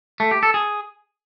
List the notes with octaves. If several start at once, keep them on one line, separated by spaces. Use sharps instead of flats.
A3
G4
A4
G#4